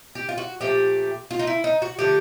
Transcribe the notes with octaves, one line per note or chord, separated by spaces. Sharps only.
G4
F4
F#4
A#2 F3 A3 G4
F4
D#4
E4
D#4
F#4
D3 F3 A3 G4